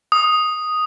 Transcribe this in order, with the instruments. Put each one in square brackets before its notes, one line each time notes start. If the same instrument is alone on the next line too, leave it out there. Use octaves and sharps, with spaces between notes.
[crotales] D#6